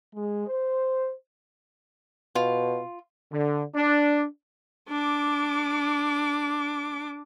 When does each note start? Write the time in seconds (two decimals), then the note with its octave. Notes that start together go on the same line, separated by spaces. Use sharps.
0.15 G#3
0.48 C5
2.35 B2 F4
3.32 D3
3.75 D4
4.89 D4 D6